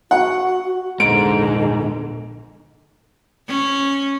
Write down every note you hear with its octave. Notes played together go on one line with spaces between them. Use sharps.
F#4 F#5
A#1 E2 G#2 D3 D7
C#4